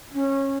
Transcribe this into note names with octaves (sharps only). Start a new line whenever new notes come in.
C#4